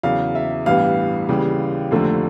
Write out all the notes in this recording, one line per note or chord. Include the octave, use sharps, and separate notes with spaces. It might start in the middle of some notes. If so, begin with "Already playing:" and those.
E2 C#3 F#3 F5
E5
A1 G2 E3 G3 B3 F5
D#2 C#3 E3 G3
F1 D#2 D3 F3 A3